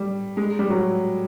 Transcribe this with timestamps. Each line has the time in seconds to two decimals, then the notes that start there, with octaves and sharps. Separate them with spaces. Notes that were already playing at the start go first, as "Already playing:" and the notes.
Already playing: G3
0.37 G#3
0.59 G3
0.70 F#3